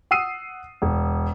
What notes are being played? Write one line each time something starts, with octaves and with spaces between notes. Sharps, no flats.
F#5 D#6 E6 C7 D#7
E1